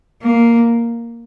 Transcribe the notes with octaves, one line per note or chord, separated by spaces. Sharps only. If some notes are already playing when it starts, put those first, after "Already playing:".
A#3